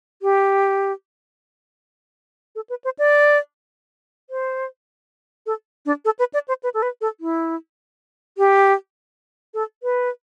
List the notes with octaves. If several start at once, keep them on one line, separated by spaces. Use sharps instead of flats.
G4
A4
B4
C5
D5
C5
A4
D4
A4
B4
D5
C5
B4
A4
B4
A4
E4
G4
A4
B4